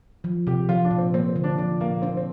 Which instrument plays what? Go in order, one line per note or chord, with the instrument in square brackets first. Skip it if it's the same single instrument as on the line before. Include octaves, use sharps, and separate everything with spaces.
[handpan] F3
[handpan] C3 [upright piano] G4
[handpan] F3 [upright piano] F4
[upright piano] D4
[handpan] A#2
[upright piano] C4
[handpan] A#3 [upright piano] C4
[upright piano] C4
[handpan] D3
[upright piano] D4
[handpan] F3 [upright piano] D4
[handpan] A#2 [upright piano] A#3
[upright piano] C4 [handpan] D4
[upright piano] C4